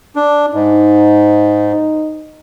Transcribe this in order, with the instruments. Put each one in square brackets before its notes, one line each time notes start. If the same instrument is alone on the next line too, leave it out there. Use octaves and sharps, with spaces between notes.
[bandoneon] D4
[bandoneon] G#2 [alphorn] D#4